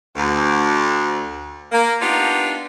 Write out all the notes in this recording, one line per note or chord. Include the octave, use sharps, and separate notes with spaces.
D2
A#3
B3 D4 D#4 F4 G4